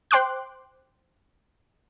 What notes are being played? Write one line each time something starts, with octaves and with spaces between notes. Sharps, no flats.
C5 G5 C6 D6 F#6